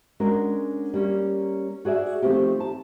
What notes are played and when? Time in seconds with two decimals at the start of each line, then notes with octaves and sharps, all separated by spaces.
0.20 G#3 C#4 D4 F#4 A#4
0.94 G3 A#3 C#4
1.85 F#4 G#4 D5 E5
2.22 D#3 F3 F#3 A3 C4 G4
2.60 A5